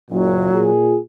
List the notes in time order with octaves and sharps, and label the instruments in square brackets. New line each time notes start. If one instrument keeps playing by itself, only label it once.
[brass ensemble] F#1 A#2 [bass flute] F#3
[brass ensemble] A#2 F4 G#4